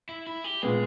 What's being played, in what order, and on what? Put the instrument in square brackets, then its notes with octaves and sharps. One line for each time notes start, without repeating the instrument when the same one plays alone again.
[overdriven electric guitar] E4
E4
G4
[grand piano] A#2 G#3 B3 [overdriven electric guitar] G#4